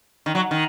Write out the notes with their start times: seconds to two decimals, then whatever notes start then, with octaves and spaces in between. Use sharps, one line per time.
0.26 D#3
0.35 F#3
0.51 D#3